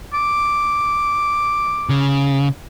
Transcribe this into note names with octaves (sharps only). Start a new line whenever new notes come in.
D6
C#3